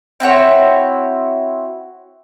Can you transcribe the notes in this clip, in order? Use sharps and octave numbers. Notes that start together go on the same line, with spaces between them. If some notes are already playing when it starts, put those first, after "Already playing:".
C4 E4 F#4 C#5